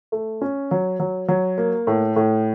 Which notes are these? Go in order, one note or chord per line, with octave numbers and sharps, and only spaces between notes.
A3
C#4
F#3
F#3
F#3
A#3
A2
A2